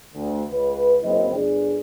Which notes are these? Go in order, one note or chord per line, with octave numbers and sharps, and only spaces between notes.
D2
C#2 B4
F#1 C4 E4 D#5
G1 D4 G#4